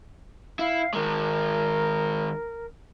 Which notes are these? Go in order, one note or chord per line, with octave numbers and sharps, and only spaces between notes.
E4 F5
D#3 G#3 A#4